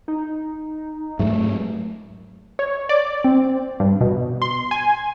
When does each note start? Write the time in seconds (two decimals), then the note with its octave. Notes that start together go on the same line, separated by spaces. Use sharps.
0.08 D#4
1.19 G#2 F#3 G#3 A3
2.59 C#5
2.89 D5
3.24 C4
3.80 G2
4.01 B2
4.42 C6
4.71 G#5